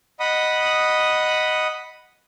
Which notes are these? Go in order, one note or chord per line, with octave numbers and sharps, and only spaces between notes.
D#5 F#5 B5 D#6